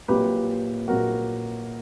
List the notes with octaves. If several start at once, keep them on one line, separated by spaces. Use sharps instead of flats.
A#1 A#2 F#3 G4 B4
A#1 A#2 F#3 F#4 A#4